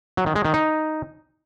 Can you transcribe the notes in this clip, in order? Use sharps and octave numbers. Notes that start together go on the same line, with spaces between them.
F#3
D#3
G#3
D#3
D#4